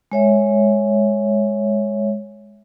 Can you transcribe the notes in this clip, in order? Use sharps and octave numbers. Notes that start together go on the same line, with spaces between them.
G#3 C#5 E5